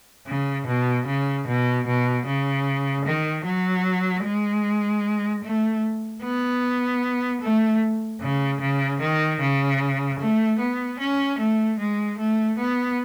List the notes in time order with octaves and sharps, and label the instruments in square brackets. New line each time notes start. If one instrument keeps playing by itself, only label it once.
[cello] C#3
B2
C#3
B2
B2
C#3
D#3
F#3
G#3
A3
B3
A3
C#3
C#3
D#3
C#3
A3
B3
C#4
A3
G#3
A3
B3